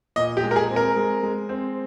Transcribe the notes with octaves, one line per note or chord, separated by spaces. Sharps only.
A#2 D#5
G4
G#3
A#4
G#4
C4
A#4
G#3
G#3
C4